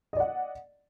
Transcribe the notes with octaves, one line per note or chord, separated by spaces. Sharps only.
D5 D#5 F#5